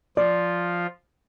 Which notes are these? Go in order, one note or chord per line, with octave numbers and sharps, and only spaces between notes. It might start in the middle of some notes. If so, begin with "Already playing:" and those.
F3 F4 D5